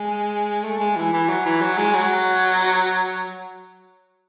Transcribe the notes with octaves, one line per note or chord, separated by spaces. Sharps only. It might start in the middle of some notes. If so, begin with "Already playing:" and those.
Already playing: G#3
A3
G#3
E3
E3
F#3
E3
F#3
G#3
F#3